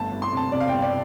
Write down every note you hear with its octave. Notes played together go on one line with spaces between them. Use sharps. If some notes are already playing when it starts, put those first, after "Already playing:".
Already playing: G1 A3 A5
G1
C6
C3 A5
C3 D5
F5
G1 G5
D5